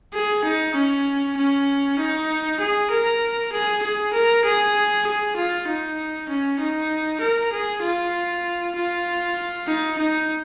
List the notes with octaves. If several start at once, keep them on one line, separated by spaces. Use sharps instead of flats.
G#4
D#4
C#4
C#4
D#4
G#4
A#4
G#4
G#4
A#4
G#4
G#4
F4
D#4
C#4
D#4
A#4
G#4
F4
F4
D#4
D#4